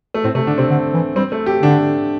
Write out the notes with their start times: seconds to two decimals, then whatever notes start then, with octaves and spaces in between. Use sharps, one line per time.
0.14 A3
0.24 A2 C4
0.35 C3 A3
0.47 D3 D4
0.58 C3 C4
0.70 D3
0.94 E3
1.16 G3 C4
1.32 A3
1.46 G4
1.62 D3 D4